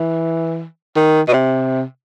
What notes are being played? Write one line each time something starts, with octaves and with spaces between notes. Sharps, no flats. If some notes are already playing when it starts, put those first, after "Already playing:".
Already playing: E3
D#3
B2
C3